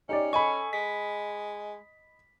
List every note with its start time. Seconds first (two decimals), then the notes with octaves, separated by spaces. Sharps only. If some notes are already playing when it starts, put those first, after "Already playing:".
0.09 C#4 D#4 G4 D5
0.33 A4 D#5 G#5 B5 C#6
0.73 G#3 B6